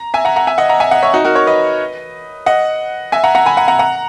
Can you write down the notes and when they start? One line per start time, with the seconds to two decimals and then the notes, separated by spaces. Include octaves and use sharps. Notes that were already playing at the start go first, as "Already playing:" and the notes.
Already playing: A#5
0.14 E5 G#5
0.25 F#5 A#5
0.36 F#5 A#5
0.47 E5 G#5
0.58 D#5 F#5
0.69 F#5 A#5
0.80 E5 G#5
0.91 D#5 F#5
1.02 C#5 E5
1.13 D#4 F#4
1.25 F#4 A#4
1.35 A#4 C#5
1.47 B4 D#5
2.46 D#5 F#5
3.12 E5 G#5
3.24 F#5 A#5
3.35 F#5 A#5
3.46 G#5 B5
3.57 F#5 A#5
3.68 F#5 A#5
3.79 F#5 A#5